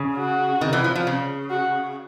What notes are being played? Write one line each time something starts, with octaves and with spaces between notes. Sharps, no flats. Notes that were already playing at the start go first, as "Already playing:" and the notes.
Already playing: C#3
F#4
D#3
E3
F3
F3
C#3
F#4